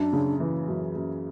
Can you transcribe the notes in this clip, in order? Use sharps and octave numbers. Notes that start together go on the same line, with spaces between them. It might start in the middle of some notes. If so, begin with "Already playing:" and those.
Already playing: F#2 D4
C#3
E3
F#2
F#2